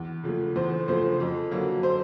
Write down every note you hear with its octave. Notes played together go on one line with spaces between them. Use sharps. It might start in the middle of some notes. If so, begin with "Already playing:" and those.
Already playing: E2
C#3 F3 A3
E2 C5
C#3 F3 A3 C5
F2
D3 F#3 A#3
C5